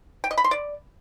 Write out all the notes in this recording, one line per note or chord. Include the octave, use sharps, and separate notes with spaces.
G5
D#5
B5
C6
D5